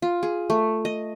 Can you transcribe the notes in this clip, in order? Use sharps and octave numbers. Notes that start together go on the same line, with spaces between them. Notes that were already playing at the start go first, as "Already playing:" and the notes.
F4
G#4
A3
D#5